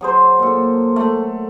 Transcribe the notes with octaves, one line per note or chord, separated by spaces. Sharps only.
F#3 G#4 C5
A#2 A4
A3